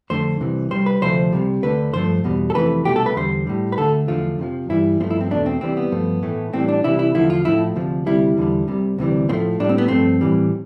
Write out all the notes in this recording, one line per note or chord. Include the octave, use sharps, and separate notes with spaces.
F2 D3 A3 C5
C2 C3 E3
C2 B2 G3 C5
B4
D2 C3 F3 A3 C5
C2 C3 G3
D2 D3 A3 B4
G2 F3 A3 C5
E2 B2 G3
A4
F2 C3 E3 A3 B4
C2 B2 A3 G4
A4
B4
E2 D3 G3 C5
A2 G3
B4
D2 D3 A3 A4
E2 D3 F3 A3 F4
F2 C3 F3
G2 E3 G3 E4
G2 F3 A3 C4
E4
C4
E2 B2 A3 D4
C4
C2 C3 E3 G3 C4
B3
G2 F3 A3
A2 E3 A3
A2 E3 G3 C4
D4
C2 C3 E3 G3 E4
E4
E2 D3 F3 A3 E4
F4
A2 F3 A3 E4
D2 C3 F3
D2 C3 G3 E4
E2 D3 G3
C2 C3 G3
D2 C3 E3 G3
A2 F3 A3 C4
A2 G3 D4
C4
B3
G2 F3 A3 C4
A2 E3 G3